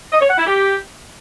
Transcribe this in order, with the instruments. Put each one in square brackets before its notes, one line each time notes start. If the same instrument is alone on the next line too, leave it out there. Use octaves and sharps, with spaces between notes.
[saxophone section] D#5
C#5
F#5
E4
G4